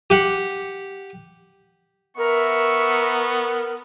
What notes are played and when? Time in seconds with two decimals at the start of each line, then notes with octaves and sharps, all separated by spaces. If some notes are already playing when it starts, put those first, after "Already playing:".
0.10 G4 F#5
2.18 B3 A#4 E5 C#6